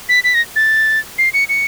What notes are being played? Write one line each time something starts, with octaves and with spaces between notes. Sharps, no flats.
B6
B6
A#6
A6
C7
C#7
C#7